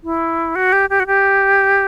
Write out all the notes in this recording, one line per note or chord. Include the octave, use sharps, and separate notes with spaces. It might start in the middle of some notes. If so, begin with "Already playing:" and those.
E4
F#4
G4
G4
F#4
G4